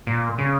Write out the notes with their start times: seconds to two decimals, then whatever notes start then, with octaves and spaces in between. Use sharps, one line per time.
0.07 A#2
0.38 C#3